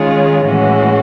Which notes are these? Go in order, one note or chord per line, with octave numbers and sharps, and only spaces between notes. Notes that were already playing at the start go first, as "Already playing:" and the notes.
Already playing: D#3 G#3 C#4 F4 G#4
A2 E3 G#3 C#4 F#4